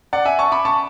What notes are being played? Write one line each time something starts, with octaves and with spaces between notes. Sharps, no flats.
D5 F#5
E5 G#5
A5 C#6
B5 D6
A5 C#6